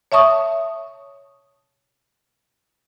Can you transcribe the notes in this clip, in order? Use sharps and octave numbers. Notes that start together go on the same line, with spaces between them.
C#5 E5 A5 C#6 D#6